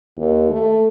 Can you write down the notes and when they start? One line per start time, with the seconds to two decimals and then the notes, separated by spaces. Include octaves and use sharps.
0.18 D#2
0.50 A3